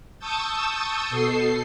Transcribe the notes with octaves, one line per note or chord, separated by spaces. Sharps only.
A5 C#6 D#6 E6 G6 A6
B2 A4 C7